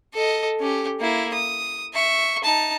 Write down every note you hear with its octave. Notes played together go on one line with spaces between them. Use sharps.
A4 D#5
C#4 G4
A#3 E4
D#6
E5 C#6
D#4 A5